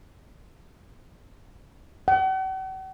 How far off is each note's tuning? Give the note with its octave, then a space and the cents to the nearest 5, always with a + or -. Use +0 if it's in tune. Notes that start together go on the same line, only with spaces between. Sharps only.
F#5 +45